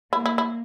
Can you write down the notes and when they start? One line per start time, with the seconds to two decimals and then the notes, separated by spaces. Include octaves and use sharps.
0.13 A#3 E4
0.26 E4
0.38 E4